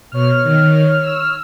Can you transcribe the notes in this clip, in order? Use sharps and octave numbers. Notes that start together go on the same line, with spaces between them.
B2 C#5 F6
D#3
E6